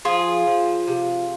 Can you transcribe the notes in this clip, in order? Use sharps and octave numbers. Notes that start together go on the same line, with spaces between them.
F3 F4 G#4
F3
C3